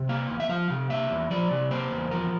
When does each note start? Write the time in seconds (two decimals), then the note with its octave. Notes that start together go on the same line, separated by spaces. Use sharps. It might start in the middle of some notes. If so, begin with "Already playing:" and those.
Already playing: C3
0.09 A#3 F5
0.29 E2
0.40 E5
0.49 F3 F5
0.70 C3
0.90 A#3 E5
1.10 E2
1.30 F3 D5
1.51 C3
1.71 A#3 C5
1.91 E2
2.11 F3 A#4